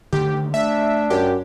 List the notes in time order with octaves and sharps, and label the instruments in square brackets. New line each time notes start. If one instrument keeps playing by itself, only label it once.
[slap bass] D3 D#3 A3 [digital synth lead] G4
[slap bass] A3 [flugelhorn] D4 [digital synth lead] E5
[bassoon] F#2 [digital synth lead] G4